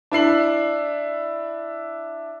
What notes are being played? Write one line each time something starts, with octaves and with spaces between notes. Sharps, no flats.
D4 E4 C7 F#7